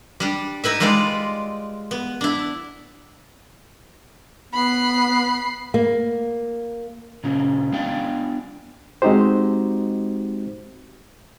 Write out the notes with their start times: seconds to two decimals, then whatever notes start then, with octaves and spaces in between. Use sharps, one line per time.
0.20 G3 D4
0.64 D#4 E4 B4 E5
0.80 G3 G#3 F4 B4 D5
1.91 B3
2.21 D4 E4
4.53 B3 B5 C7
5.74 A#3
7.24 A#2 C#3 C#4
7.73 B3 D4 D5 F5 G5
9.02 G#3 C4 D#4 F#4 G4 C5